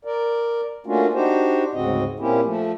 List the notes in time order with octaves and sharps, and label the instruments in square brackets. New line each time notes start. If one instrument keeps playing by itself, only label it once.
[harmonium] A#4 D5
A3 A#3 C#4 D4 F4 F#4
D4 D#4 F#4 G4 C5
D2 G#2 C#3 C4 F#4 D#5
A#2 A#3 C4 C#4 E4 G4
F3 A3